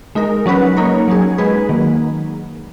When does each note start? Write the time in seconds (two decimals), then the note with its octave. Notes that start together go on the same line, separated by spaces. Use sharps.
0.15 G#3 D#4 A#4
0.46 F#3 C#4 F#4 B4
0.77 A#3 D#4 A#4 C#5
1.08 F#3 C#4 G#4
1.38 G#3 D#4 G#4 B4
1.69 D#3 F#3 A#3